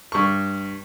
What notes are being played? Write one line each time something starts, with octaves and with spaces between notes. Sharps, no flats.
G2 C#6